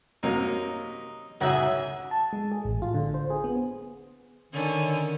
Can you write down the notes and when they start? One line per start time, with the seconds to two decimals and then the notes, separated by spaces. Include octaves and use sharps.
0.23 F#2 C3 A#3 D#4
1.41 C#2 G#2 F#3 G#4 E5 F#5
2.11 A5
2.33 G#3
2.52 G#4
2.65 A1
2.82 F4
2.94 D3
3.14 C5
3.30 G#4
3.44 B3
4.53 D3 D#3 C#4